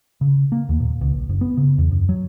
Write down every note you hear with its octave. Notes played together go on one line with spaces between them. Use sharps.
C#3
A#3
D#2
A#2
C#2
A#1
F#1
B3
C#3
E2
F#2
F#3